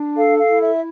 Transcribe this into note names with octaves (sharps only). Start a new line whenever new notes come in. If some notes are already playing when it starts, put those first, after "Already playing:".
Already playing: D4
A4 F5
F5
E4
E5